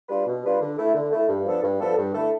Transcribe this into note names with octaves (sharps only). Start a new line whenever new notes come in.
G3 D4 F4 B4
B2
G3 D4 F4 B4
D3
A3 E4
D3
A3 E4
G2
F3 B3 D4 A4
G2
F3 B3 D4 A4
G2
D3 A3 E4 A4